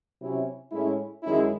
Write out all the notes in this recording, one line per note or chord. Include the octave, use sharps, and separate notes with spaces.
C3 F#3 C#4 E4
A2 G#3 C#4 E4
F#2 D#3 G#3 C#4 E4